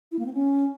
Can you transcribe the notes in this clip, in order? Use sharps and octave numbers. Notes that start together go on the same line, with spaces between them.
E4
A#3
C4
C#4